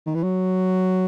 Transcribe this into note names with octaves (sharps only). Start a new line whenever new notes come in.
D#3
E3
F#3